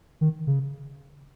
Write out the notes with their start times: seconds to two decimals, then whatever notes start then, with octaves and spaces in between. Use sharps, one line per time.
0.21 D#3
0.47 C#3